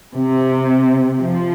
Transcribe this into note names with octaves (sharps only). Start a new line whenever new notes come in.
C3
F3